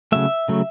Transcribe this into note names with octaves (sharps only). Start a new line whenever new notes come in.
C#3 F#3 A3 E5
C#3 F#3 A3